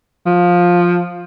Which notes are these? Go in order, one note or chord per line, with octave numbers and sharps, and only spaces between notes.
F3